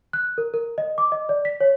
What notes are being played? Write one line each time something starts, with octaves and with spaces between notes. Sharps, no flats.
F#6
A#4
A#4
D#5
D6
D#5
D5
B6
C#5